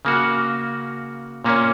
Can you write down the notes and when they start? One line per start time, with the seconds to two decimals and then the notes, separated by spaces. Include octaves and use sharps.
0.05 C#3 A#3 F#4
1.44 A#2 A#3 C#4